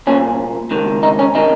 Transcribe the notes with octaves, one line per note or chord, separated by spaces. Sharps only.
C2 A#2 C#4
C#2 C3 D#3
D#4
C#4
C3 D#3 D#4